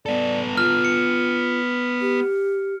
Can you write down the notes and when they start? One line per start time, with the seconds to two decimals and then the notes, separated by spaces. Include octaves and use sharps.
0.06 B3 A4 D5
0.57 F4 F6
0.85 C#7
2.01 G4